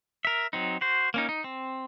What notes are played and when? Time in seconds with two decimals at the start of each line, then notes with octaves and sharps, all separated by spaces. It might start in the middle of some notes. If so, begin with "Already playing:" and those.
0.25 A#4 E5
0.53 F#3 C4 D#4
0.81 F#4 C5
1.14 A#3 C#4 D#4
1.29 D#4
1.44 C4